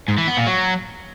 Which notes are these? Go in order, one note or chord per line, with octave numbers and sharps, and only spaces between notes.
G#2
E3
B3
A#2
F#3